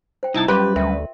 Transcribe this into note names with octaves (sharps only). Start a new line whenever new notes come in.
C5 G5
C2 D#4 E4 A5
F#2 G3 F4 G4 B4 F5 C6
D2 A#4 E5 G5